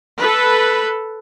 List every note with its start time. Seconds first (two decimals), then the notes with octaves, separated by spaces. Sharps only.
0.21 A4 B4